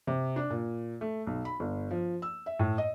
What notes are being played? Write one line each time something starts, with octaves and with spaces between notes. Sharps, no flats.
C3
D4
A#2
A3
B1
B5
G1
F3
E6
E5
A2
D#5